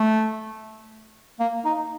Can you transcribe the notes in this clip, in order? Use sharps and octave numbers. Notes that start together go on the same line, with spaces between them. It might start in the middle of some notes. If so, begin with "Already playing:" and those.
Already playing: A3
A#3
D#4